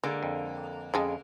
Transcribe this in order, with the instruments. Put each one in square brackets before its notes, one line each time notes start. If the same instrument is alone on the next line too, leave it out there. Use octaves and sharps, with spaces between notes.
[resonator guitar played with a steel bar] D3 A#3 [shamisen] G#3
[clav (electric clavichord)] F2
[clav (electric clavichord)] F2 [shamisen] C#3 G#3 A5